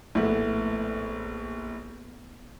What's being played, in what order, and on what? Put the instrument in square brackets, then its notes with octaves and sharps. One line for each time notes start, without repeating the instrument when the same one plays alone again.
[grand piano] A#1 A2 [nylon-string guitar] A3 B3 E4